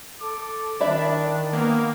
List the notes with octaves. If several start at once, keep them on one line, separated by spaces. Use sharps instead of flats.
A4 D6
D#3 D4 E4 D5 E5
A#3 B3